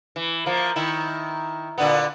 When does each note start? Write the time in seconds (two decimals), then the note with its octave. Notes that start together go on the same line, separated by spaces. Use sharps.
0.16 E3
0.46 F3 A#3
0.76 D#3 E4
1.78 A#2 D3 B3